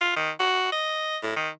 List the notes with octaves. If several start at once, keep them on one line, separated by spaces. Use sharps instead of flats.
F4
D#3
F#4
D#5
A2
D#3